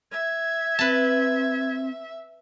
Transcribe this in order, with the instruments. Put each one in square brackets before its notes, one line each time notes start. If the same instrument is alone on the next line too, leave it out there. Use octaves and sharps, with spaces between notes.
[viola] E5 [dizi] G#6
[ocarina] C4 [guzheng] B4 A5